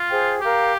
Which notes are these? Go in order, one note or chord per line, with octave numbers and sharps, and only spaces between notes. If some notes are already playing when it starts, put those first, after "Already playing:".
Already playing: F4
G#4 C5 G5
G4 A#4 F5 A#5